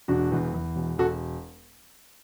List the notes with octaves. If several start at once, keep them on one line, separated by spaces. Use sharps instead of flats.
E1 D4 F#4
E2
E2
E1
E1 F#4 A4